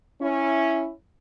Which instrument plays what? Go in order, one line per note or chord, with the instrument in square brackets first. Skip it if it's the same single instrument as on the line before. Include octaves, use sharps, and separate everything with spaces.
[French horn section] C#4 E4